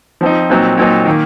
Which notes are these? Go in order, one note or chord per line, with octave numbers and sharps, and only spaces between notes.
F3 C4 D#4
A#2 F#3 C4 D#4
A#2 F#3 C4 D#4
D#3 A#3